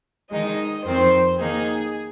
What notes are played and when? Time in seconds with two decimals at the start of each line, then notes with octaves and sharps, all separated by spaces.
0.31 D#3 G#3 D#4 D#5
0.85 F2 D#3 C4 C5
1.40 D#3 A#3 D#4 G#4